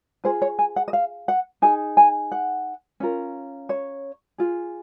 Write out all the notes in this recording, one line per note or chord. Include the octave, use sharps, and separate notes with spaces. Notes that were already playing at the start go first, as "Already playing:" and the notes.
F4 G#4 C5
C#5
G#5
F#5
D#5
F5
F#5
D#4 G#4 G#5
G#5
F#5
C#4 F4 A#4
C#5
F4 G#4